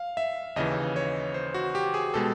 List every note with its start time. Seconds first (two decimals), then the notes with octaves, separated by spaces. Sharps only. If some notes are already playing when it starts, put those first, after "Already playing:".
Already playing: F5
0.17 E5
0.56 D#2 C#3 E3 D#5
0.96 C#5
1.34 C5
1.54 F#4
1.75 G4
1.94 G#4
2.14 B2 G#3 A4